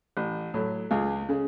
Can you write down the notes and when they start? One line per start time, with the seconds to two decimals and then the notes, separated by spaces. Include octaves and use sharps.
0.17 A1
0.54 A2 F#3
0.91 C#2 F4 G#4
1.29 C#3 G#3